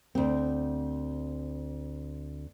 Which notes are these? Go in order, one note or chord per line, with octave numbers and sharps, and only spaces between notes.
D2 C4